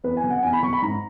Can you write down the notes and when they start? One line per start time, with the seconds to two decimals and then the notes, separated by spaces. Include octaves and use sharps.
0.04 E2 B4
0.17 G#5
0.24 B2
0.30 F#5
0.43 E2 G#5
0.53 B5
0.63 B2 C#6
0.73 B5
0.82 G#2 A#5